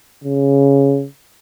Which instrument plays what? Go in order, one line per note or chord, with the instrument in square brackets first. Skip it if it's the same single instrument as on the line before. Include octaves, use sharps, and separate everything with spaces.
[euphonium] C#3